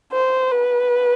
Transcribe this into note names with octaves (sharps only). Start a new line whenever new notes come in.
C5
B4